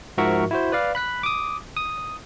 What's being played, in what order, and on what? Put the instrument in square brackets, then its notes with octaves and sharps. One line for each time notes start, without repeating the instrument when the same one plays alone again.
[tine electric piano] G#2 F3 F#4 A#4 E5 C#6
E4 F#4 C5
B4 D5 F5
B5 F#6 B6
D6 D#6
D#6